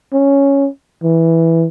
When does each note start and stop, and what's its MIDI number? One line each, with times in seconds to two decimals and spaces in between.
0.13 0.68 61
1.03 1.66 52